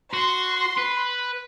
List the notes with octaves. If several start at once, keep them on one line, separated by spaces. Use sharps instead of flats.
F#4 C6
B4